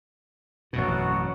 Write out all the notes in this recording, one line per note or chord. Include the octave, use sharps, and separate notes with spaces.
A1 F#2 B2 F#4